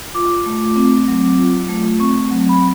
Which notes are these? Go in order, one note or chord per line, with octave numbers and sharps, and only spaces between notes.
F4 D6
A3
C4
F#3
F4
A3
C4 C#6
F#3
B5